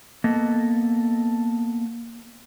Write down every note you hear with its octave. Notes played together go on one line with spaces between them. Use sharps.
A#3 B3 A4 D#5